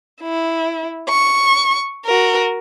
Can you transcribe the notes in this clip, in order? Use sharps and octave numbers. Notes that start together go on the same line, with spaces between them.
E4
C#6
F#4 A#4